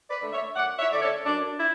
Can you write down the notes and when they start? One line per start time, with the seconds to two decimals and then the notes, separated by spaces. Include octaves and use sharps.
0.10 B4 D5
0.21 D3 A3
0.33 C#5 E5
0.56 F#2 D5 F#5
0.79 C#5 E5
0.91 D3 A3 D5
1.02 A4 C#5
1.25 F#2 D4
1.60 E4